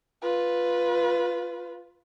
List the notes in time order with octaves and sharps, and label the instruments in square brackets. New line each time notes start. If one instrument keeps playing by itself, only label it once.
[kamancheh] F4 B4